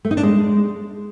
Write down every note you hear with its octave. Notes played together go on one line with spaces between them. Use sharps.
A3
D#4
D4
G#3